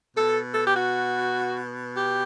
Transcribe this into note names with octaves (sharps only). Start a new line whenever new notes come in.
B2 A4
A4
G4
F#4
G4